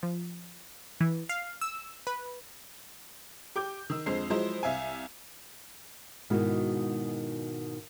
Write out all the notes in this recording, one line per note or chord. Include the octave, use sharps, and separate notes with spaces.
F3
E3
F5
E6
B4
G4 D6 G6
D#3 E6
F2 D3 G#3 C5 C7
F3 F#3 G#3 E4 C5
C2 E5 F5 G#5
G#2 B2 D#3 G#3 E4 F#4